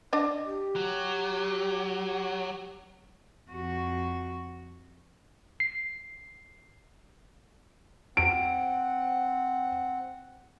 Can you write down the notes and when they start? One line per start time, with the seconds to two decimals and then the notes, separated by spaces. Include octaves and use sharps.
0.13 D4 D5 D#5
0.45 G4
0.76 F#3
3.51 F2 F#4
5.60 C7
8.17 C4 F#5 D7